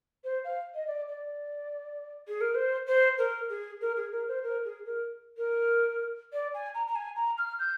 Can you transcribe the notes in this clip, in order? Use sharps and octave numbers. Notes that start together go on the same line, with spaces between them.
C5
F5
D#5
D5
D5
G#4
A#4
C5
C5
A#4
G#4
A#4
G#4
A#4
C5
A#4
G#4
A#4
A#4
D5
G#5
A#5
A#5
G#5
A#5
F6
G6